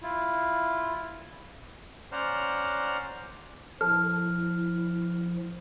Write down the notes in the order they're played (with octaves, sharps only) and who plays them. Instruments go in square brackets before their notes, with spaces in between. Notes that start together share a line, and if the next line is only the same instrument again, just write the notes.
[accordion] E4 F4
[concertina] C#4 C5 D5 F#5 A#5 F6
[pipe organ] F3 [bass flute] E4 [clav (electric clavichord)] A4 [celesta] F6